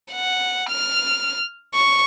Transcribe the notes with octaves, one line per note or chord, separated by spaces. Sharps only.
F#5
F6
C#6